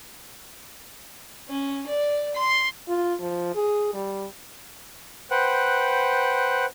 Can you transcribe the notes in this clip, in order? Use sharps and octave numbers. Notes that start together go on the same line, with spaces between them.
C#4
D5
C6
F4
F3
G#4
G3
B4 C5 F#5 G5 F#6